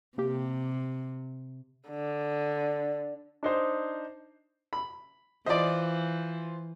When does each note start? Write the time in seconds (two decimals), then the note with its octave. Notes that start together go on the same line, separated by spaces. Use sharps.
0.18 C3 A#3 G4
1.89 D3
3.43 D4 D#4 C5
4.73 B5
5.46 E3 F4 C5 D5 D#5